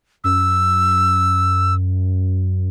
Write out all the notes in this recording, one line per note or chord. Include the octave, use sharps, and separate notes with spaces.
F#2 E6